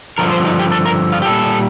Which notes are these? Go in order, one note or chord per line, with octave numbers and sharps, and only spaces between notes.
G2 D3 F3 A#4
C5
D#4
G4
A4
A#4
F4
G4
A#2 G3 A4